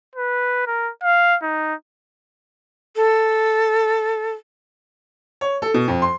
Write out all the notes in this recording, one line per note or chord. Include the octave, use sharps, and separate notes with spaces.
B4
A#4
F5
D#4
A4
C#5
A4
B2
F2
C6